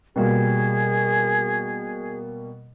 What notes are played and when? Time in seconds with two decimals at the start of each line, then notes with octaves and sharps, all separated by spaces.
0.16 B2 G3 A#3 G#4